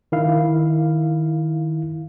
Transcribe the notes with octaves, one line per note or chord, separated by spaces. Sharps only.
D#3 E4 F5